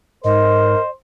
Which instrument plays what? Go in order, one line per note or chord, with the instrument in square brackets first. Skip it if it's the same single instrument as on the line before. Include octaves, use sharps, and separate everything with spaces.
[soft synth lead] G#2 [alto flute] A#4 [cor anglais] C5 [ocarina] D#5